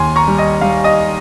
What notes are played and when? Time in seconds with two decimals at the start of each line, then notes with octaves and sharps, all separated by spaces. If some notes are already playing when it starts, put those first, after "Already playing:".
Already playing: D#2 G#5 C6
0.16 A#5 C#6
0.27 G3
0.38 D#5
0.61 G3 F5
0.84 D#5